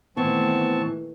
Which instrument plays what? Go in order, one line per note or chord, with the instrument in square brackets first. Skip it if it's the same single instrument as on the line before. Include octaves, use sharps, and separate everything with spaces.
[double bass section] A#2 D#3 A3 [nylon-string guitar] E3 [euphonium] B3 [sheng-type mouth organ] C4 A5 C#6